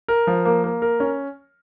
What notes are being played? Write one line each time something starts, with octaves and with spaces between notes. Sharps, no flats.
A#4
F3
A#3
A#3
A#4
C#4